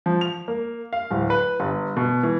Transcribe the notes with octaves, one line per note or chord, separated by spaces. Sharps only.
F3
F7
A#3
F5
D1
B4
G1
B2
E3